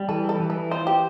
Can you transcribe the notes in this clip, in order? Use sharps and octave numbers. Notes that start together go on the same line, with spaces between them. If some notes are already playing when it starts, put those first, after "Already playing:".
Already playing: G3
E3 A4
A4
E3
B4
F4 C5
G4